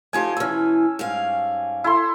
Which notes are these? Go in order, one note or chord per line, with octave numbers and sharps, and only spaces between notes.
F3 A3 D#4 G4 G#5
B2 E3 C#4 E6
G#2 G3 F5
E4 A4 C6